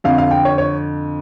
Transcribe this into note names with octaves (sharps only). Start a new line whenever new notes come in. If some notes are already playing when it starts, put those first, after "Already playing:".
F2 D3 F5
F5
G5
C#5
C#5